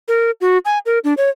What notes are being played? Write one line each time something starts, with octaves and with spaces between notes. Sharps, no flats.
A#4
F#4
G#5
A#4
D4
C#5